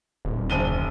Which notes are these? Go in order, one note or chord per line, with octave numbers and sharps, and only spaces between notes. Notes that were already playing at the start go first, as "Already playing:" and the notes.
D#1
F#1 D#7 G7